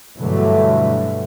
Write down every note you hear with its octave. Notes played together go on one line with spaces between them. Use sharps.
G2 B2 D3 E3 F#3 A3